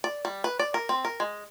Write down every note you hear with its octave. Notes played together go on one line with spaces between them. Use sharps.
D5
G3
B4
D5
A#4
C4
A#4
G#3